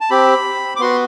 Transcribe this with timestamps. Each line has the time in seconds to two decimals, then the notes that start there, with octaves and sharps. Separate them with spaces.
0.01 A5
0.10 C4 G4 B5
0.76 D6
0.80 B3 F#4 C6